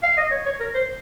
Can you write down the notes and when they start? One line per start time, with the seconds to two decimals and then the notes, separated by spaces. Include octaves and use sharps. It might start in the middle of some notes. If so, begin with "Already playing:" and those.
0.03 F5
0.18 D#5
0.31 C#5
0.46 C#5
0.60 A#4
0.75 C5